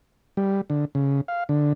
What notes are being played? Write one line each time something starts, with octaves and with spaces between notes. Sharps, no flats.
G3
D3
C#3
F5
D3